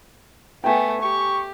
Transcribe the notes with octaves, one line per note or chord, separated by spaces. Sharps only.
A3 B3 G5 G#5
G4 C#6